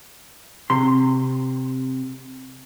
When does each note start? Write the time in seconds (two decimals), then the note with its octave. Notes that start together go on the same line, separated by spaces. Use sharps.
0.70 C3 C6